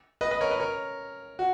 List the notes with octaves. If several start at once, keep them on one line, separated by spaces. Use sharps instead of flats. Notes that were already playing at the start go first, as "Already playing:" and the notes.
B4 D#5
B4 D#5
A#4 C#5
B4 D#5
A#4 C#5
F#4